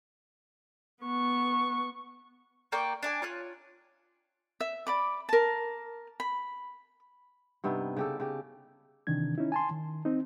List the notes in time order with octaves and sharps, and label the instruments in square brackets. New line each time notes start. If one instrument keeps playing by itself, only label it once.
[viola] B3 C#6
[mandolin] A#3 D5 G5 C#6
D4 D5 G#5
F4 C#5 F#6
[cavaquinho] E5
D5 B5 D6
A#4 A5
B5
[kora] G2 C3 B3 D#4
C#3 G4 A4
C#3 G4
[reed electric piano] C3 D#3 E3 D4 G#6
C#4 D#4 E4
G#5 A5 C6
D#3
C4 D#4